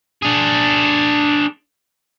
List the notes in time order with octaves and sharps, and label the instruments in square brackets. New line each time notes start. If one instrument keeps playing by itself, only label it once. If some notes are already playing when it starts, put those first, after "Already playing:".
[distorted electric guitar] D4 G#4